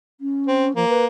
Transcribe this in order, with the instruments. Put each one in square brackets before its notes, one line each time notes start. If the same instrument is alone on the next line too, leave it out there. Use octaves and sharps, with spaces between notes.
[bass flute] C#4
[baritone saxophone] C4
[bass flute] F3 [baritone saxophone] A#3
[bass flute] B4